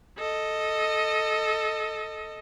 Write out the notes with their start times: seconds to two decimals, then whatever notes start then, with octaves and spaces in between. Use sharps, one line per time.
0.18 A4 D#5